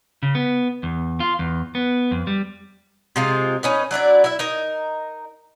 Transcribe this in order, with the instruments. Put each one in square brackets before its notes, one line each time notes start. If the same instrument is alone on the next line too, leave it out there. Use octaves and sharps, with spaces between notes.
[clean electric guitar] C#3
B3
E2
F4
E2
B3
F2
G3
[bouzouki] C3 G#3 F4
C#4 D#4 B4
F#3 D4 E4 D5
E4 E5
D#4 A#4